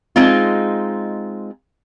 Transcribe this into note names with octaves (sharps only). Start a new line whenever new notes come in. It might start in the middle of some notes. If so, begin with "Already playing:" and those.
G#3 C4 D#4 F4